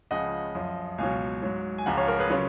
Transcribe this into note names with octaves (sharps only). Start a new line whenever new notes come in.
C#2 C#3 F3 D#5 F#5
F#2 F3
C#2 B2 F#3 F5 G#5
G#2 F#3
G#5
C#2 C#3 F3 F#5 A#5
C#5 F5
A#4 C#5
G#4 B4
C#3 F#3 C#4 F4